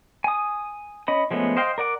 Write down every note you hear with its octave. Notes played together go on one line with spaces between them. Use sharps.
G#5 D#6
C#4 D#5 B5
F3 G#3 A3 B3 C#4
C5 D#5 F5 G5
A#4 D5 F#5 D6